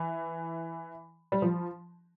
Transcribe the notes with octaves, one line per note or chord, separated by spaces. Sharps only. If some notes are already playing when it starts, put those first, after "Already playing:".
Already playing: E3
G3
F3